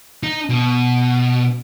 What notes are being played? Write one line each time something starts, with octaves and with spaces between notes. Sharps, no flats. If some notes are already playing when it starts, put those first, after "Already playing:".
D#4
B2